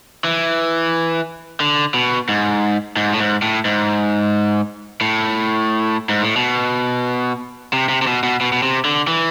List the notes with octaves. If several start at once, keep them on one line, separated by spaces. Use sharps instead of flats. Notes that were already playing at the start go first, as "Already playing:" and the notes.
E3
D3
B2
G#2
G#2
A2
G#2
A2
G#2
A2
G#2
A2
B2
C3
C3
C3
B2
B2
B2
B2
C3
D3
E3